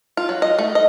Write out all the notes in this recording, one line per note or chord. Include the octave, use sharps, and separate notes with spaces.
F4
F#3
D#5
A3
D#5